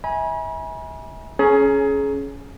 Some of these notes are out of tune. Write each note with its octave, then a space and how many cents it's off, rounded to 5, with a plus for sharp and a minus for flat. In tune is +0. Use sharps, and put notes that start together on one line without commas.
E5 -40 G#5 -5 B5 -45
C#4 +0 G#4 +25 A#5 +0